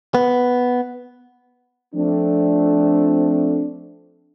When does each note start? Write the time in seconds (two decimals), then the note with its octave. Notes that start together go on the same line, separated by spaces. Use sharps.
0.15 B3
1.95 F3 A3 C4 D4